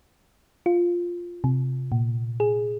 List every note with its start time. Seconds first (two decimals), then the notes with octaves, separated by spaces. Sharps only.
0.66 F4
1.44 C3
1.92 A#2
2.40 G#4